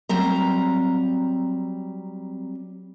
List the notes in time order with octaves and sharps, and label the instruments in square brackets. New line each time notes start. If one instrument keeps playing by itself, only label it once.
[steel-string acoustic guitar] F#3 G3 C4 A#5